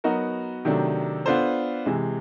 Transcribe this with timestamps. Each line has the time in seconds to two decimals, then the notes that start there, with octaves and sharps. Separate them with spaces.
0.04 F#3 B3 D#4 F#4 A#4
0.65 C3 D#3 F#3 A3 D4
1.26 B3 D4 F4 A4 C5
1.86 C3 E3 G#3